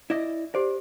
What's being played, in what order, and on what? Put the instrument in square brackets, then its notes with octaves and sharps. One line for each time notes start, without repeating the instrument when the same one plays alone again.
[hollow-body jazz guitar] E4 D5 D#5
[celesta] G4 C5 [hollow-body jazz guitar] D5